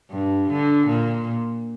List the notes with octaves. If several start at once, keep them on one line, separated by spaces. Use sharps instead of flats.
G2
D3
A#2